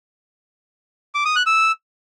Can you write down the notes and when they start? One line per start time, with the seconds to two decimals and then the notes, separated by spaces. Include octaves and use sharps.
1.15 D6
1.25 D#6
1.36 F#6
1.46 E6